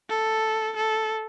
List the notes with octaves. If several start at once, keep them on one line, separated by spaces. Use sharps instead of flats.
A4
A4